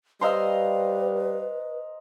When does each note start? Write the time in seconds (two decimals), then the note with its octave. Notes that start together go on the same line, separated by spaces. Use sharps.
0.21 G3 B4 C5 D#5 F5 A#5 C6 E6